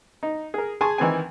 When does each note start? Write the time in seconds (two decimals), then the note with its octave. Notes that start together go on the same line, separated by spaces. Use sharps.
0.23 D#4
0.54 G#4 A#4
0.81 G#4 G#5 A5 C6 C#6
0.98 D#3 E3 C4 G#5